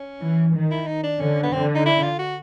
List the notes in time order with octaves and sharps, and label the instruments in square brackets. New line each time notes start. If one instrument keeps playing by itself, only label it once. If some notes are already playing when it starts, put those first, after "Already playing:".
Already playing: [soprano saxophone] C#4
[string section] E3
D#3
[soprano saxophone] E4
D#4
D4
[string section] D3 [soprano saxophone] C#4
[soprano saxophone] B3
[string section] D3 [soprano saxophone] C4
[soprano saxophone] D#4
E4
F4
F#4